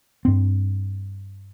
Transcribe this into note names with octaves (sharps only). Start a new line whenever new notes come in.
G2 C4